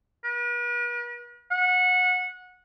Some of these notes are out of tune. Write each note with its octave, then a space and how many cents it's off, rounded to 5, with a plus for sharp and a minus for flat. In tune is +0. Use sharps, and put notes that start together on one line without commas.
B4 -45
F#5 -20